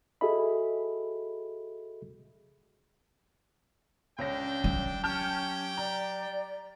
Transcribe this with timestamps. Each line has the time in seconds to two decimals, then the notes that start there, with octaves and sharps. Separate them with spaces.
0.21 F#4 G#4 A4 D#5 E5 B5
4.18 C#2 C#4 D4 G5 A#6
4.64 F#3
5.04 C#4 G4 G5 A5 F6 G6
5.77 D5 A#5